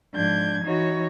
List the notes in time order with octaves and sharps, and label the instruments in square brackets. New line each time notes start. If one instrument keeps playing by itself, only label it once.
[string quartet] G#2 F3 D4 G6 G#6
E3 D#4 F#4 C#5